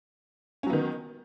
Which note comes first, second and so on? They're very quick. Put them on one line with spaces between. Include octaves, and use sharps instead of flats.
C#4 F#3 B3 D#3